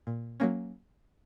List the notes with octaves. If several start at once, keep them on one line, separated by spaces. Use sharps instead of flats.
A#2
F#3 A#3 C#4